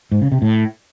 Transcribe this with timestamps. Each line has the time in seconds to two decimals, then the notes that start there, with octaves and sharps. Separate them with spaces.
0.12 G#2
0.22 C#3
0.32 C3
0.42 A2